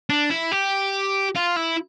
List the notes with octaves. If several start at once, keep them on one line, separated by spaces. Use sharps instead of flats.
D4
E4
G4
F4
E4